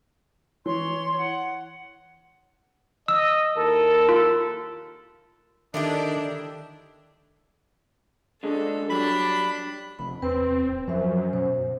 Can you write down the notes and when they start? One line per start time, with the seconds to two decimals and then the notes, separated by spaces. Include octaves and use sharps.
0.66 E3 C#5 C6
1.18 F#5
3.08 D#5 E6
3.56 D#2 E4 A4 A#4
4.09 F4
5.74 D3 D#3 D4 E4 G4
8.43 D3 G#3 D4 A4
8.90 F#3 G3 D4 A5 B5
9.99 F1 B5
10.22 E2 C4 B4 C6
10.66 D1
10.87 F#2 F3 C5 E5
11.33 B2 C5